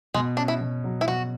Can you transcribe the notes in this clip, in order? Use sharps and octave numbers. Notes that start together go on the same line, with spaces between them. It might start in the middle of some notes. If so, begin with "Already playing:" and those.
B2 G#3
C#4 D4
E4
B2
F#3
E4
B2 F#4